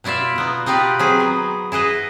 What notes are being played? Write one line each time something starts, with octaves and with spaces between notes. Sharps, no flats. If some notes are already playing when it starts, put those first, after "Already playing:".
B2 E4 F4 D5 E5
B2 B3 D#4
D#4 F4 G4 B4 D5
F#3 C4 G#4 B4
B3
E4 G#4 B4 D#5